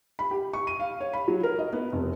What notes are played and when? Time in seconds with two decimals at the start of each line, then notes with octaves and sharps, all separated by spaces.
0.19 B5
0.31 G4
0.53 C#6
0.67 D#7
0.80 F5
1.01 C#5
1.13 B5
1.28 F#3
1.43 A#4
1.59 D#5
1.73 B3
1.92 F1